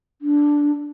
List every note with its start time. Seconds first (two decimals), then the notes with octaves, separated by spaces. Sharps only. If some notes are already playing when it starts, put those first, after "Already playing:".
0.22 D4